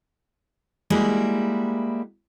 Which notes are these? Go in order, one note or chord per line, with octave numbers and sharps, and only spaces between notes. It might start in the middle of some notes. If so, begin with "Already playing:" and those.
G3 G#3 A#3 E4 F#4